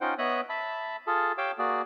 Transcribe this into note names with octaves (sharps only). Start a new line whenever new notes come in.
C#4 D#4 F4 C5 F#5 G5
B3 C#5 D#5 E5 D#6 F#6
E5 A5 B5
F4 G#4 A4 A5
G4 C#5 F5 G5 D6 E6
A#3 F#4 G#4 D5